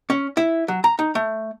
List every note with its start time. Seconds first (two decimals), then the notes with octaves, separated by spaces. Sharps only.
0.10 C#4
0.37 E4
0.68 F#3
0.84 A#5
0.99 D#4
1.15 A3